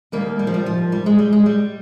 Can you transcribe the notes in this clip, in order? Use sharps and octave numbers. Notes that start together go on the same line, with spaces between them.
D#2 D#3 G3 A#3
G3
F3
G3
F3
G3
G#3
G3
G#3
G3